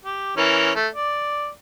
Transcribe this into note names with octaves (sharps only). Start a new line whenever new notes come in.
G4
E3 C#4 A#4
A3
D5